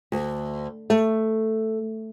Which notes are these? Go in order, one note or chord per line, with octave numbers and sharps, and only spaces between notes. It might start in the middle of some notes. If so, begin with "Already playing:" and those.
D2
A3